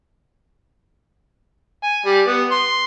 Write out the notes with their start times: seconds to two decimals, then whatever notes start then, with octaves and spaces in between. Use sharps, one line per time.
1.83 G#5
2.05 G3
2.27 B3
2.51 C6